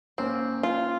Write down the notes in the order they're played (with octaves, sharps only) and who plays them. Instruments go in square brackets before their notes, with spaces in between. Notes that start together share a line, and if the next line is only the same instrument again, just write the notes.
[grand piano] A#3 C#4 [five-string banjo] C4
[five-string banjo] F4